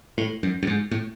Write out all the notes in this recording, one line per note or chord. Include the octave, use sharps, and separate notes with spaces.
A2
F#2
F#2
G#2
A2